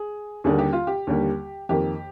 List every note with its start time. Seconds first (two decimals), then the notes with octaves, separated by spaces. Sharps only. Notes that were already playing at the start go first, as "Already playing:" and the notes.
Already playing: G#4
0.44 D#2 D3 G3 A#3 G#4
0.59 G4
0.73 F4
0.87 G4
1.07 D#2 D3 G3 A#3
1.69 F2 D#3 A#3 G4